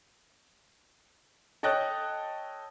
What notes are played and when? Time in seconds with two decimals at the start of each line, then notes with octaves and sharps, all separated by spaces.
1.63 A4 C#5 D#5 G5 A5 F#6